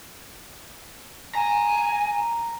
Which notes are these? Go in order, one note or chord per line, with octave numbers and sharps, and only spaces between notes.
G#5 A#5